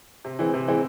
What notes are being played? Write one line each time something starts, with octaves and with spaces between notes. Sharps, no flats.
C3
E3 G#3 C4
C3
E3 G#3 C4